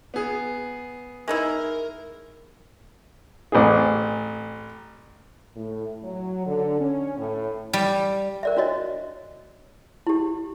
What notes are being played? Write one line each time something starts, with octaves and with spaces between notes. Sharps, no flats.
B3 G#4
G#3 D#4 E4 A#4
A1 C4 G#4
A2
F#3
D3
C#4
A2
G3
A#4 D5 E5
D4 F#4 C#5 D#5
E4 G4